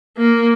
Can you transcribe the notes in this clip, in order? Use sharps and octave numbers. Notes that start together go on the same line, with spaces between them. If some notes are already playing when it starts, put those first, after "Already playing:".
A#3